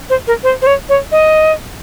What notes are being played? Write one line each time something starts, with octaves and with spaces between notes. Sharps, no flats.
C5
A#4
C5
C5
C#5
C#5
D#5